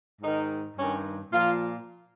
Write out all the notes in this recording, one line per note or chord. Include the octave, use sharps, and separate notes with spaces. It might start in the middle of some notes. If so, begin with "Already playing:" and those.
G#2 D#3 D#4
G2 D#3 C#4
A#2 F3 F4